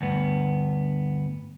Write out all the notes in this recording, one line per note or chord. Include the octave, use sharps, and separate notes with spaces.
D2 G2 B3